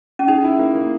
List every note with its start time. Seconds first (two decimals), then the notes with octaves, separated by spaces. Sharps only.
0.19 C#4
0.27 D#4 G#4
0.44 E4
0.59 A#3
0.75 A#3